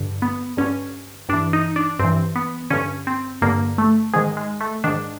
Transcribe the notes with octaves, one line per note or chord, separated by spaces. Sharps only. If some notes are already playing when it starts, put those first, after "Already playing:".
Already playing: G2 D3
B3
G2 D3 C#4
G2 E3 D4
D#4
D4
G2 E3 C4
B3
G2 D3 C#4
C4
G2 D3 A#3
A3
G#2 D#3 G#3
G#3
A3
G#2 D#3 D4